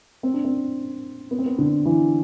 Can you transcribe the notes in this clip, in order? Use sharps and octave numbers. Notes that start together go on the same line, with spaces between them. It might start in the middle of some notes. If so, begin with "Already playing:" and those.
C4
D4
C4
B3
C4
B3
D3
E3